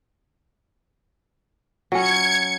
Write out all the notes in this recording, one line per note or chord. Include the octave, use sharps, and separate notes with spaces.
F#3 C#4 G#6 C#7